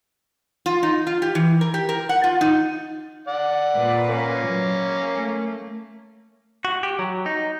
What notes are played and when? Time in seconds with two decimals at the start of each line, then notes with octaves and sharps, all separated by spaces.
0.66 F4
0.83 D#4
1.07 F4
1.22 G4
1.35 E3
1.61 A#4
1.74 G4
1.89 A#4
2.09 F#5
2.24 F4
2.41 D#4
3.27 D5 F#5
3.76 A#2 B4
4.08 A#3 C#4
4.45 F#3
5.14 A3
6.65 F#4
6.83 G4
6.99 F#3
7.26 D#4